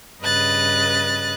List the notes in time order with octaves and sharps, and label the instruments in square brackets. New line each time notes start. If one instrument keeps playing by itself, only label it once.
[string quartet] G2 C#3 B4 D#5 F#6 A6